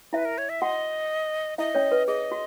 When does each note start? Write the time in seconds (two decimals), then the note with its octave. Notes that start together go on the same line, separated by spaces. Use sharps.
0.13 E4 B4 E5
0.25 A#4
0.38 C#5
0.49 E5
0.61 F#4 D#5 F#5
1.58 E4 D#5 E5
1.75 C#4 C#5
1.92 B4
2.07 G#4 D#5
2.31 F#4